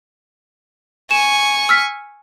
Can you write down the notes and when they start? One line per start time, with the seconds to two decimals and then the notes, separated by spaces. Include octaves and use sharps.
1.11 G#5 C#6 E7
1.69 E6 F6 B6